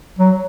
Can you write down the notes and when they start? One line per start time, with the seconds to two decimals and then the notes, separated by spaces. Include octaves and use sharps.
0.19 F#3